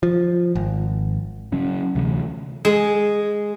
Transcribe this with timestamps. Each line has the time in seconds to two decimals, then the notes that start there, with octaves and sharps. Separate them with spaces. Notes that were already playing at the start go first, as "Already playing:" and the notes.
0.03 F3
0.55 G#1
1.52 C#3 F#3 C#4
1.95 D2 C3 E3
2.65 G#3